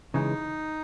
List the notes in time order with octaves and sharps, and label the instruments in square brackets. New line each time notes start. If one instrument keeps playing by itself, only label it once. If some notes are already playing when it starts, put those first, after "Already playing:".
[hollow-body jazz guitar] C#3 E3 G#3 [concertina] D#4